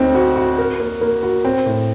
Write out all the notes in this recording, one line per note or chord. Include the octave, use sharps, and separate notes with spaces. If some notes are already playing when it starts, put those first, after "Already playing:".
Already playing: D2 C4 D#4
F#4
F#4
A#4
A#3
A#3
F#4
C4
A2